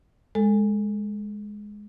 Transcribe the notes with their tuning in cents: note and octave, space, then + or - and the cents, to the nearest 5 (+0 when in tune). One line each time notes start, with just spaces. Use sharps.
G#3 +0 A4 +10